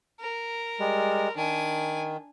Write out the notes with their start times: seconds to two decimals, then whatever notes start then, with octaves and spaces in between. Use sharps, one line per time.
0.20 A#4
0.80 G3 G#3
1.36 D#3 D4 G#5